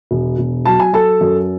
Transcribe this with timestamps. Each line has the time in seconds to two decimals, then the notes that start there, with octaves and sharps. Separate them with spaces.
0.11 E1
0.38 E1
0.65 F#3 A5
0.80 G#5
0.93 F#3 A4 A5
1.21 F#2